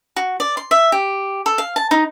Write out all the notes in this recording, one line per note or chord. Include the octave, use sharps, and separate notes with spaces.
F#4
D5
C6
E5
G4
A4
F5
A5
D#4